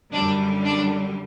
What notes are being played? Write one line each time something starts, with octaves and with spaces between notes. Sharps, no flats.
F#2 D3 G3 D4
D4